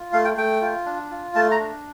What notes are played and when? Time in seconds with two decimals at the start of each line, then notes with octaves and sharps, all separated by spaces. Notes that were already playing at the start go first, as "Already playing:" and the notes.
Already playing: F4
0.13 A3 F5
0.25 G5
0.37 A3 G5
0.61 F4
0.86 D4
1.11 F4
1.35 A3 A5
1.51 A#5
1.59 D4